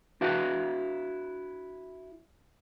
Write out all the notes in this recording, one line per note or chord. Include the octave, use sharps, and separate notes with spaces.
D4 E4 F#4 B4 F5